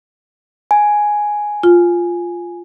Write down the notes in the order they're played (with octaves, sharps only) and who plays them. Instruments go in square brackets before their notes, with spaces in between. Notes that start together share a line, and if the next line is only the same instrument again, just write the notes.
[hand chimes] G#5
[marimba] F4